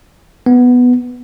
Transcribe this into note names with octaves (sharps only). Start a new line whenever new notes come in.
B3